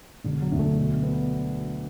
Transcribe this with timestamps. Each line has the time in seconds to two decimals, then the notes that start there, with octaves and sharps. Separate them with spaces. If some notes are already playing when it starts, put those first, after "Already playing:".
0.24 E1 D3
0.42 F#3
0.52 D2
0.59 A3
0.78 B2
1.03 B3